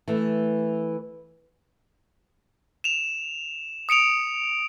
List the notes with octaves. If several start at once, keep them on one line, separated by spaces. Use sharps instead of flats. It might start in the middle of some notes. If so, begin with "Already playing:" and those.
E3 A3
E7 F7
D#6 C#7 D7 F7